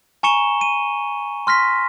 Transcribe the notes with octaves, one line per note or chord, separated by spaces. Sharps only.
G#5 A#5 C#6 C#7 E7 G7
D#7
C6 F6 A#6 B6